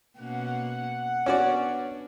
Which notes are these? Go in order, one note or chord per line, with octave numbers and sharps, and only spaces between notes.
B2 A#3 C#4 F#5
B3 C#4 D4 F#4 D5